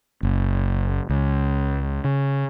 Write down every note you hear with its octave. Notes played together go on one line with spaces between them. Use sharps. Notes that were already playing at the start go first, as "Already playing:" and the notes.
F#1
C#2
C#3